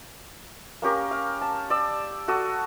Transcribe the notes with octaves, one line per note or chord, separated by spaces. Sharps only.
A#3 C#4 G4 A#4
F5
A5
D5 E6
F#4 A4 D#6